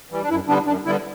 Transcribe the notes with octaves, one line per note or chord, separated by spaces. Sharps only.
E3 G3
D4
F#2 E4
D3 G3 B3 D4
F#2 D4
D3 G3 B3 E4